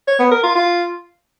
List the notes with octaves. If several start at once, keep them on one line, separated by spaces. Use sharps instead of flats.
C#5
B3
A#4
F4
F4